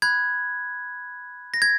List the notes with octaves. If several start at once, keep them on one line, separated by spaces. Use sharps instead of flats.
B5 F#6 G#6
A#6
G#6